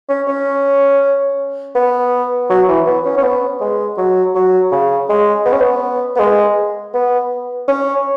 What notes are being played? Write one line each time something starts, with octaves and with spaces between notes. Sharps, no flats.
C#4
C#4
B3
F#3
E3
B3
C#4
C#4
B3
G#3
F#3
F#3
C#3
G#3
B3
C#4
B3
B3
G#3
B3
C#4